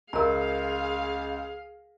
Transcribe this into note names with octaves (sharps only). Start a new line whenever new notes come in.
C#2 G#4 A#4 F5 A#5